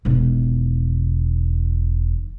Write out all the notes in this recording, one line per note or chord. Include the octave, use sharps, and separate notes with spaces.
E1 D#3